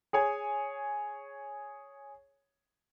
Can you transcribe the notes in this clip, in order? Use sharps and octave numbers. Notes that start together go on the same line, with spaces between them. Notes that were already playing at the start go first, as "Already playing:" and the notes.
G#4 C#5 G#5